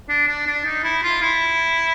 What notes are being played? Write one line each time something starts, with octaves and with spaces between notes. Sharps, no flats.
D4
D4
D4
D#4
E4
F4
E4